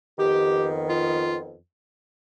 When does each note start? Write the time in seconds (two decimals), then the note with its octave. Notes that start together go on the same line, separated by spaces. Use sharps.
0.17 F2 D#3 B3 G4
0.88 F4